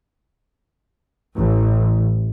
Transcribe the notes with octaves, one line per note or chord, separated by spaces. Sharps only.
A1